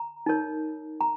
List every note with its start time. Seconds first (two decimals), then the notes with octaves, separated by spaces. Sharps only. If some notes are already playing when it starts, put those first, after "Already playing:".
Already playing: A#5
0.26 D#4 A#4 C#5
1.01 A#5